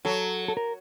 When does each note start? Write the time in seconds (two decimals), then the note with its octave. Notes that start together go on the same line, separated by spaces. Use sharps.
0.05 F#3 A4
0.48 A4
0.57 A#4